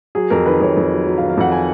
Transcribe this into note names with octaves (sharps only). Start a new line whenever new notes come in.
F#3 G#4
F2 A#4
D#3 B4
F2 C#5
F2
F#3
F#3
F5
D#3
F5
F2 F#5
G#5